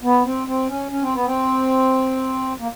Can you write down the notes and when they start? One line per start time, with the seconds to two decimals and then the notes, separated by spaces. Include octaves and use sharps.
0.03 B3
0.25 C4
0.47 C4
0.69 C#4
0.91 C#4
1.02 C4
1.14 B3
1.26 C4
2.60 A#3